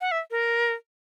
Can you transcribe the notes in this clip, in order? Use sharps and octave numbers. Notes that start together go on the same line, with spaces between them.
F#5
E5
A#4